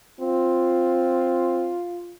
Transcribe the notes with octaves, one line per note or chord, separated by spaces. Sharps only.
C4 F4